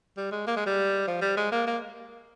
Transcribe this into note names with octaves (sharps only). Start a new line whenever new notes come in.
G3
G#3
A#3
G#3
G3
F3
G3
G#3
A#3
A#3